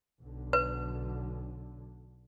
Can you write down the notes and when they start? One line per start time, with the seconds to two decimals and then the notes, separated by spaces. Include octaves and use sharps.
0.20 B1 D3
0.53 B4